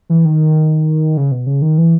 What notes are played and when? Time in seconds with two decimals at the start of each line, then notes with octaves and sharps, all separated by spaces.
0.09 E3
0.25 D#3
1.17 C#3
1.32 B2
1.47 C#3
1.62 D#3
1.78 E3